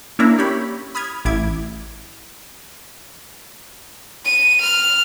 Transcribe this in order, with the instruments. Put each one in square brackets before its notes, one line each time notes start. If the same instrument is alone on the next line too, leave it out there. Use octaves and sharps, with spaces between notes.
[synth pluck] A#3 C#4 D4 E4 E5 A#5
G4 C#5 B5
B5 D#6 F6 G#6
A1 E4 D6 G#6
[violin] D#7
F6